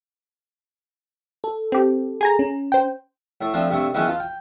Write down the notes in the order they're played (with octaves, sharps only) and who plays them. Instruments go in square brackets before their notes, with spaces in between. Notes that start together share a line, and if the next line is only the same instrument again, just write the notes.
[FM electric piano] A4
[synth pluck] C4 G4
G#4 G#5 A#5
[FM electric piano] C#4
[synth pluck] C5 G5
[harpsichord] A2 A3
F3 A3 C4 D4
G2 C3 A3
D#3 E3 F#3 G#3 B3 C#4
F4 A5
G5